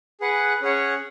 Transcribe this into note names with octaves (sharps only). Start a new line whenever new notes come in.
G#4 B4 F#5
C#4 G#4 C#5 F#5